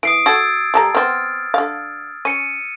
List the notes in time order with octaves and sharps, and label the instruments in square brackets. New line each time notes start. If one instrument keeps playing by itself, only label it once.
[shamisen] E3 [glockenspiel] D#6 C7 D7
[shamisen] F#4 A4 [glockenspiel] E6 G#6 A6
[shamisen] G3 A4 A#5
[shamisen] B3 C4 [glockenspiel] F6 A6
[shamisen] D3 F5
[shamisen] C#4 [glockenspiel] C#7 D#7